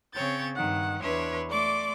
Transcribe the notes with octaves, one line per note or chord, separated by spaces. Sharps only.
C#3 C4 C#5 G6 A6
G2 D#3 F#5
E2 D4 B4 C#5 E5 C6
A3 D5 C6 D6